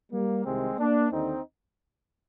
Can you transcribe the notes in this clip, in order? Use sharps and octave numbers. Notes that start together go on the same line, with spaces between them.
G3 A#3
C2 C3 D#3 G#3 C4
A#3 D4
D#2 D3 C4 D#4